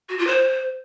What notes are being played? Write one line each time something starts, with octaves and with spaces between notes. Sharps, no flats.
F#4
F4
C5